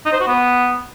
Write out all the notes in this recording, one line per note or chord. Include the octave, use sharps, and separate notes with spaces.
D#4
C5
F#4
B3